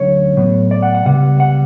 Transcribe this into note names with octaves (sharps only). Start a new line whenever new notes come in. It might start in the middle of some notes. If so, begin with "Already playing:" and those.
Already playing: D2 D3 F#3 C#4 C#5
A2 F#3 B3
D5
F#5
F#5
C#2 C#3 G3 B3 F#5
F#5